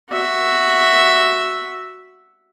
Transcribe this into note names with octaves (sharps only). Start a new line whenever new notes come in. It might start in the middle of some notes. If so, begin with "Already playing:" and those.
F#4 E5